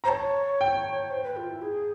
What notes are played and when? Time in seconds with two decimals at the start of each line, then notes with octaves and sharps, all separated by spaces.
0.04 C5 A#5
0.08 C#5 A5
0.61 G5
1.11 C5
1.24 B4
1.37 F4
1.50 E4
1.62 G#4